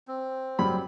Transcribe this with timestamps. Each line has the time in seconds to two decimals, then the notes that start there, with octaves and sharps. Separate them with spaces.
0.08 C4
0.59 F#2 G3 B5